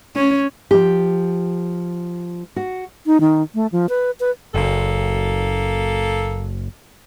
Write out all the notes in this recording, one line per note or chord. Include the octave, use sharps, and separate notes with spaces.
C#4
F3 G4
F#4
D#4
D#3
A3
F3
B4
B4
F#1 A#3 A4